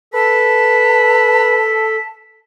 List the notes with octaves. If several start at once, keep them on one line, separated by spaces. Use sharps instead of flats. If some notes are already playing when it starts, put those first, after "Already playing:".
A4 B4 A5 B6